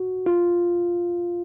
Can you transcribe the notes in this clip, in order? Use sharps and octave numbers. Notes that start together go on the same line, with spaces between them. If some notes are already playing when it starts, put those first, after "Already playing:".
Already playing: F#4
F4